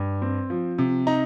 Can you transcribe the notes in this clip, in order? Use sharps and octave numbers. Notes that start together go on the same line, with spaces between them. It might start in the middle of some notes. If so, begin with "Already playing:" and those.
Already playing: G2
C4
F3
C3
D#4 A#5